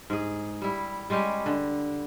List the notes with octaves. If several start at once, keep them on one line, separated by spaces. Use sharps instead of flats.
G#2 G#4
G3 E4
G3 G#3 C#4 G4
D3